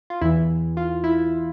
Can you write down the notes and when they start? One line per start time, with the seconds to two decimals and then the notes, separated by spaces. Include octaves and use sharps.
0.10 F4
0.21 E2 E3 E4
0.77 F4
1.04 E4